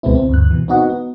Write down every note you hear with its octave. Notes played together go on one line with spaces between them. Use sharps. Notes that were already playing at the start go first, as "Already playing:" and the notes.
C#2 B2 G#3 B3 C4 E4
C4
D2 G2 F#6
B2 E3
B3 C4 D#4 F#4 D#5 F#5
B3